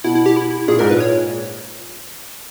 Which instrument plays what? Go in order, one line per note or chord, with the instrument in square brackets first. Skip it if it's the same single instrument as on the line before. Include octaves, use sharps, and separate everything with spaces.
[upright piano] B2 [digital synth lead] E4
[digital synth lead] E4
G4
E4
[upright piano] A#2 [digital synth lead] G#4
[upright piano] G#2 [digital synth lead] A#4
[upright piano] A#2 [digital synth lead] B4
[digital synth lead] C#5